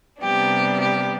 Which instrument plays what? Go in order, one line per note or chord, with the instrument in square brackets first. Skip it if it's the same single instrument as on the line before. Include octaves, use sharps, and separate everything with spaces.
[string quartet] C3 G3 B3 D4 G4
G4